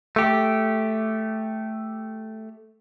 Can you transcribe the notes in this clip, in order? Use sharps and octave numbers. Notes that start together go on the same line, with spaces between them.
A3 G4